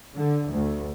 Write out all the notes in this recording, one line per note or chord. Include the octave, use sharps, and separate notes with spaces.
D3
D2